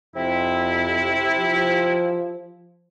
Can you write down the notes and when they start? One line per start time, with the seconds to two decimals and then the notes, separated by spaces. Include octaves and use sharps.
0.16 F2 C3 E4
1.39 F3